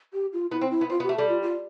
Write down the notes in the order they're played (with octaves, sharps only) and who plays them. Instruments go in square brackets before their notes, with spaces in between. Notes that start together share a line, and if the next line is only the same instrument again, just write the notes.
[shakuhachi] G4
F4
[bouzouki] B3 [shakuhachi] E4
[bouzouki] C4
[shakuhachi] E4
[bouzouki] B3
[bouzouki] C4 [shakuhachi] F4
[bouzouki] B3
[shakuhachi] G4
[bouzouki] A3
[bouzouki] G3 [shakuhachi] A4
[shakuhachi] F4
F4